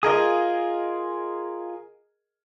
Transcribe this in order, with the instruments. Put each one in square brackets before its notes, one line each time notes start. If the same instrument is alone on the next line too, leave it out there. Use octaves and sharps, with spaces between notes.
[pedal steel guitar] F4 G#5 D#6 [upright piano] G#4 A#4 D#5